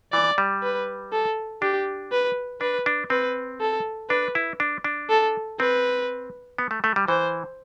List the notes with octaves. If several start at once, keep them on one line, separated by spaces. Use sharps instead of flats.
E3 D5
G3
B4
A4
D4 G4
B4
D4 B4
D4
C4 B4
A4
D4 B4
E4
D4
D4
A4
C4 B4
B3
A3
A3
G3
E3 C5